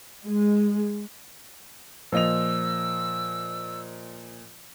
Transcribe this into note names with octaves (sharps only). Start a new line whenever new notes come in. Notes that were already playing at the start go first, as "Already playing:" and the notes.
G#3
A#2 F3 D#5 E6 F7